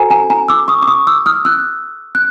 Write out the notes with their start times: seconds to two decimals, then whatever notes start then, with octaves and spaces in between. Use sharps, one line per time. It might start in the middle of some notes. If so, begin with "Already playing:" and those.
Already playing: F#4 A4 C5 G#5 A#5
0.10 G#5 A#5
0.30 G#5 A#5
0.48 D6 E6
0.68 C#6 D#6
0.82 D6
0.87 C#6 D#6
1.07 D6 E6
1.26 D#6 F6
1.45 E6 F#6
2.15 F#6